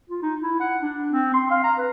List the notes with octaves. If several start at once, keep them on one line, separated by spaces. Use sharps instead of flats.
F4
D#4
E4
F#5
D4
C4
C6
F5
A#5
B4